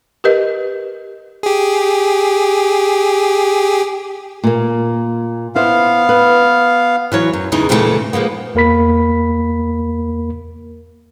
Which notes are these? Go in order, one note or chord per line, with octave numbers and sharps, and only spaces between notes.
G4 A#4 B4 D#5
G4 G#4
A#2 A#3
B3 E4 C5 F5
B4
E3 F#3 C#5
F#2
E2 C#3 E3 D#4
A#2 C#3 E3 F#3 G3 A3
F3 G#3 A#3 B3
E2 A#3 A#4 B5 B6